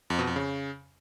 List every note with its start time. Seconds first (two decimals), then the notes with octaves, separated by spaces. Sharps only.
0.10 F2
0.19 B2
0.27 F2
0.36 C#3